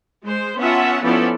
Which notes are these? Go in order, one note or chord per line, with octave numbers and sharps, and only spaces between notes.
G#3 C5
B3 C#4 F4 E5 F#5 A5
F3 B3 C#4 E4 A4 D5